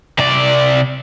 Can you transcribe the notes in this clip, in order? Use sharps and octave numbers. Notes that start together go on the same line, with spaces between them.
C3 D5